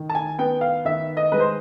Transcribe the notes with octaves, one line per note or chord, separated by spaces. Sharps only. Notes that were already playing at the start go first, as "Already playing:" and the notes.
Already playing: D#3
A5
G#5
B3 G5
F5
D#3 E5
D#5
G#3 B4
C5